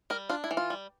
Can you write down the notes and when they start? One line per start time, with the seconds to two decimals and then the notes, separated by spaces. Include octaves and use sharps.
0.10 G3 A#4
0.29 D4 F4
0.44 E4
0.51 E3
0.57 F4
0.70 G3